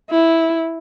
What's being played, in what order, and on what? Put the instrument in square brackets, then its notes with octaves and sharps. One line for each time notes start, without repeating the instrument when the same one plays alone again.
[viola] E4